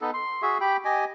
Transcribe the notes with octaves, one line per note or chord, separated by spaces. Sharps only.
B3 D#4 A4
C6
F#4 G#4 E5
G4 G5 B5
G4 D#5 G#5